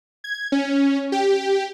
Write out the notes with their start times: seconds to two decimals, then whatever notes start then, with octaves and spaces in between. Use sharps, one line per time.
0.24 G#6
0.52 C#4
1.12 G4